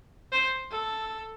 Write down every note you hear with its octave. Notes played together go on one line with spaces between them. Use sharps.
C5
A4